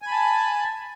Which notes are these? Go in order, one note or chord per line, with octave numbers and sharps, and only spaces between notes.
G#5 A5 B5